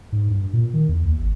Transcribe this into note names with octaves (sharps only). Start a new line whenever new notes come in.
G#2
G2
A#2
D#3
E2
D#2
G#1